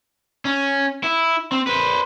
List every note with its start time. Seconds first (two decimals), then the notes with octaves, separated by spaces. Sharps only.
0.45 C#4
1.04 E4
1.52 C4
1.67 B4 C5